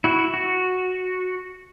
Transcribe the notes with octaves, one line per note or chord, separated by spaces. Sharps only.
E4 F#4
F#4